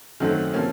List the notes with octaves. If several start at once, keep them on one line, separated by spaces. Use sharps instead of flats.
F#2 D#3 F#3 A3 C4
C3 F3 A#3 C#4